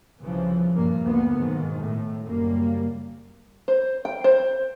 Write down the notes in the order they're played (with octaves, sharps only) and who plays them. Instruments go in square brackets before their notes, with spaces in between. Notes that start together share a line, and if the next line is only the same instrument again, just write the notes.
[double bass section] C2 C#3 E3 F3
A#1 G2 A#3
D2 A#3 B3
B1 G#2 D#3
A2
F#1 F#2 G3 A#3
[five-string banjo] C5
G5
C5